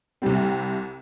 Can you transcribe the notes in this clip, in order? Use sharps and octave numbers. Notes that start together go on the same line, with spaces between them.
C2 C3 G3 C4